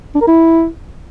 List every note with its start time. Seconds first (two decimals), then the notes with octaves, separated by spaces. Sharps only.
0.15 D4
0.21 A#4
0.27 E4